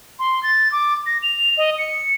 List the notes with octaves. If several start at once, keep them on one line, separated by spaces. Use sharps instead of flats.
C6
A6
D6
A#6
F7
D#5
C#7